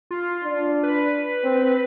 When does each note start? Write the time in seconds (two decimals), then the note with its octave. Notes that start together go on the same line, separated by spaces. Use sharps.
0.11 F4
0.44 D4
0.83 B4
1.44 C4